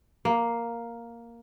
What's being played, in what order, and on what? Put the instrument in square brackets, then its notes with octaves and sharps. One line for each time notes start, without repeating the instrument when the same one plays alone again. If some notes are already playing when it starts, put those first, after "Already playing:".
[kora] A#3